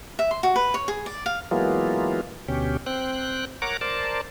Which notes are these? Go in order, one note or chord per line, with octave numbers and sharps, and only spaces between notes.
E5
C6
F#4
B4
C#5
G#4
D5
F5
E3 F#3 G#3 A#3 B3 F4
D2 B2 C#4 G4
C4 G5 F#6
A#4 C#5 F#5 A#5 D6
A#4 C5 D5 A5